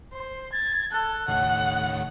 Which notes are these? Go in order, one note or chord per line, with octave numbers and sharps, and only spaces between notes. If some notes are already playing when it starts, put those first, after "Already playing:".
C5
G#6 A6
A4 F#6
D#2 A2 C#3 F#5